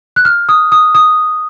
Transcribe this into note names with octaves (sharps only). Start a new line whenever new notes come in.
F#6
F6
D#6
D#6
D#6